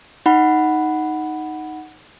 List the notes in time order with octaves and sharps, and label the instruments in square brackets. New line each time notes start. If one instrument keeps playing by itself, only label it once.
[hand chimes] D#4 F#5 B5